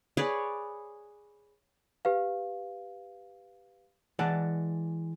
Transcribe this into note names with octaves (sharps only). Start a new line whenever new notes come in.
G#4 B4 C#5 D5
G4 B4 F5
E3 G#3 D5 F#5 A5